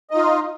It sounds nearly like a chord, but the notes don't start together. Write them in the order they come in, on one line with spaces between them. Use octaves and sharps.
D#5 D#4 F4